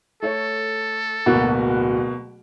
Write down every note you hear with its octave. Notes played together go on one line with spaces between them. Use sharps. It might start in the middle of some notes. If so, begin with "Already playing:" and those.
A3 A4 C#5
D1 B2 A#3 B3 F#4